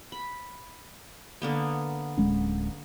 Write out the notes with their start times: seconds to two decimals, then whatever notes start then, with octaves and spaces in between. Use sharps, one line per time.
0.12 B5
1.42 D3 A#3 B3
2.17 D1 G#3 C#4